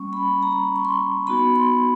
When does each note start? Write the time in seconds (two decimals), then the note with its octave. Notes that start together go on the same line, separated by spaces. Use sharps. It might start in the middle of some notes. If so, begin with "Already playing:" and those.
Already playing: G3 A#3 C#4 C#6
0.13 B5
0.43 A#5
0.76 C#6
0.85 C6
1.27 B3 D#4 F#4 B5
1.56 C6